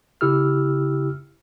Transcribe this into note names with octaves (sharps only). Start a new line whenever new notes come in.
C#3 E4 G4 E6 F6